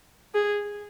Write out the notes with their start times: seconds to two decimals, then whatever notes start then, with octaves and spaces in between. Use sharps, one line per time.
0.34 G#4